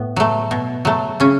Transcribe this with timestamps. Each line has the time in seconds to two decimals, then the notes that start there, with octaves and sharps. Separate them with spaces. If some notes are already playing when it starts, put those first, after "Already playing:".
Already playing: A2 B3
0.16 F#3 A3
0.51 B2
0.85 F#3 A3
1.20 C#3 C#4